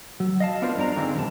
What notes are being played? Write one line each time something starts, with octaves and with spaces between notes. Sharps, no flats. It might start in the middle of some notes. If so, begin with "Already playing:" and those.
F#3
D#5 F5 A5
B3 D4 F4 A#4 C5
G2 D4 A#4 A#5
D3 D#3 G#3 A#3 C4
F#2 B2 A5